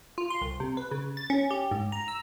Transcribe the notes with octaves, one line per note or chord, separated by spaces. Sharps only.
F4
C6
C2
C3
B4
C#3
A6
C#4
G4
G#2
A#5
E6